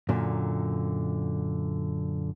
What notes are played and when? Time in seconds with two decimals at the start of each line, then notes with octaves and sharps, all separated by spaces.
0.09 F#2 A#2 D3